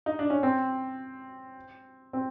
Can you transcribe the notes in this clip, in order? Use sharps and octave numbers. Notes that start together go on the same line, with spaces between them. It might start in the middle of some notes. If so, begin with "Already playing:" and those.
D#4
D4
C#4
C4
C4